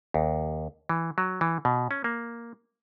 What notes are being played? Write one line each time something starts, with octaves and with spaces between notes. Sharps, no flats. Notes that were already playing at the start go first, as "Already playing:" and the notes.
D#2
E3
F#3
E3
B2
C#4
A#3